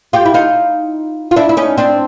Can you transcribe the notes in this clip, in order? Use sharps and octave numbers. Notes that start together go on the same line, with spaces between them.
F4 G4
E4
D#4 F4
F4
D4 E4
E4
C#4 D#4
C4 D4